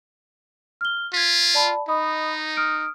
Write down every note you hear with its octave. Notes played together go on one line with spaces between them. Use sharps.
F6 G7
F4 G#6 B6
D5 A5 B5
D#4 D#5 B5 D#6
D#6 F6 D7